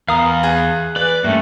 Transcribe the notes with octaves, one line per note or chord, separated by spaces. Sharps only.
E2 A#4 F5 D#6
G#4 F#5
E3 B4 D5
G2 A3 A#3 C#4